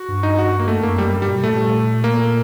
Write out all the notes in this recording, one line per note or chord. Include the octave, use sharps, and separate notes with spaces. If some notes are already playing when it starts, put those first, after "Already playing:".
Already playing: F#4
G2
D#4
F#4
A#3
A3
F#2 A#3
G3
G2
G3
A#2
C3
A#2 A3
A#3